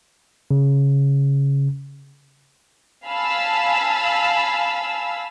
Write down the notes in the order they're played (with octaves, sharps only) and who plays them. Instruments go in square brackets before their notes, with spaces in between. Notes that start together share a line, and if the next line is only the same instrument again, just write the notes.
[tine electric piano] C#3
[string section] F5 G#5 A5 B5 E6